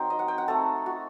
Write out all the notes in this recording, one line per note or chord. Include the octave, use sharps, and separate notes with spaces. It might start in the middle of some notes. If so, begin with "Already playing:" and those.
Already playing: F#3 C4 D#4 A#4 C5 G5
D#5
F#5
G5
F#5
A3 C4 D#4 A4
F#4